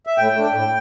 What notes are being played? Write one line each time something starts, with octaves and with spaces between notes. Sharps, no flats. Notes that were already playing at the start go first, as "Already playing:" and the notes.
E5
A2 G5
A3 D4
A2